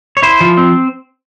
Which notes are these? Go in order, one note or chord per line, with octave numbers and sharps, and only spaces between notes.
C#5
E4 C5
F3
C4